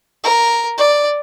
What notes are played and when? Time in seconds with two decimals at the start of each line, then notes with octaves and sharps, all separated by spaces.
0.24 A#4
0.78 D5